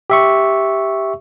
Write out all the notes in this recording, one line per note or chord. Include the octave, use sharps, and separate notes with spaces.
G4 E5 C#6